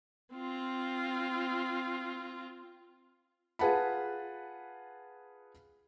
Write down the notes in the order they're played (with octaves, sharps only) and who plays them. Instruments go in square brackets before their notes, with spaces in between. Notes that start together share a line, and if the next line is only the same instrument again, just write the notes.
[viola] C4 F4
[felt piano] F4 G#4 B4 F#5 A5 B5